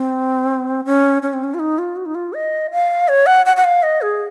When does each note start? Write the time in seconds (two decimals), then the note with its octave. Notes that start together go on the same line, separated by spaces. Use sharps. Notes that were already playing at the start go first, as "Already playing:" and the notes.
Already playing: C4
0.85 C#4
1.22 C#4
1.33 C4
1.44 C#4
1.54 F4
1.59 D#4
1.79 F4
1.96 F#4
2.06 D#4
2.15 F4
2.33 D#5
2.71 F5
3.08 C#5
3.26 F#5
3.46 F#5
3.57 F#5
3.64 F5
3.83 D#5
4.02 G#4